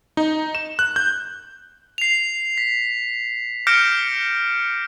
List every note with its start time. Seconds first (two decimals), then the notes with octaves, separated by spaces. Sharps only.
0.17 D#4
0.55 E7
0.79 F#6
0.96 G6
1.98 C7 F7
2.58 B6
3.67 D6 F6 G6 A#6 C#7 D7